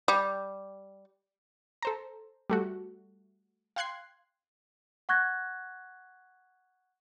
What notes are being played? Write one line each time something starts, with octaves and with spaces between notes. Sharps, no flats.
G3
A4 C5 A#5
G3 A3 F#4
F5 G5 C6 F#6 G#6 C7
F#5 C#6 F#6 G#6 A#6